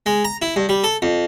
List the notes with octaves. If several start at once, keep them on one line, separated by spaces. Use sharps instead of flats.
G#3
A#5
E4
G2
G3
A4
F2